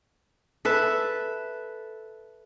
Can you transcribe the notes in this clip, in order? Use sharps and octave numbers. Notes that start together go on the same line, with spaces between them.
A4 B4 E5